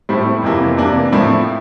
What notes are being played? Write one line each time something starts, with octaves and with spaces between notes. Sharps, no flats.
A2 G3 C4 E4
F2 C3 E3 A#3 E4
C3 E3 A#3 D4
A2 F3 C4 E4